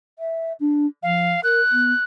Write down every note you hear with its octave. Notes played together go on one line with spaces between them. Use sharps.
E5
D4
F3 F5
A#4 F#6
B3